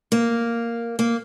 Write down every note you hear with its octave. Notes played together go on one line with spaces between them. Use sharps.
A#3
A#3